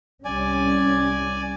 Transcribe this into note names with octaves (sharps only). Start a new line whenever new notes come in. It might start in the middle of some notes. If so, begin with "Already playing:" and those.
C2 G3 C#4 D5 G#5